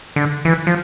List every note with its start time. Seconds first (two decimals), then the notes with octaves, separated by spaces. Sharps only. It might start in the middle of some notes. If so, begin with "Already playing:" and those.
0.16 D3
0.45 E3
0.67 F3